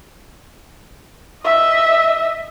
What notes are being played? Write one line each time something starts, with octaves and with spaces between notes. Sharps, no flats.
D#5 E5